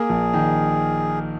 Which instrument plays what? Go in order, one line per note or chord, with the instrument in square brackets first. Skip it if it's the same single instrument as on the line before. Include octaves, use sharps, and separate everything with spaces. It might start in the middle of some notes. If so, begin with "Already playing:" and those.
Already playing: [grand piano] A#3 [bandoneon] G#4
[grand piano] A#1
D#3